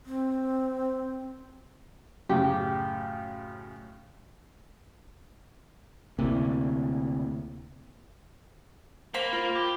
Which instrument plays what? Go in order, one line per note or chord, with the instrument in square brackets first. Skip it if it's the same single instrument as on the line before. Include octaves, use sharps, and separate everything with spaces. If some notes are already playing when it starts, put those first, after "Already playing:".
[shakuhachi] C4
[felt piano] F#2 A2 C#3 [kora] G4
[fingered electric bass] D2 C3 [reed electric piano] A#3 E4
[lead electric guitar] A#3 [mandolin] C5 B5
[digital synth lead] F4
[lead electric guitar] G4